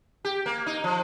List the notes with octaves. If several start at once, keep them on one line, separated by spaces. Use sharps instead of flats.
G4
A#3
D#4
F3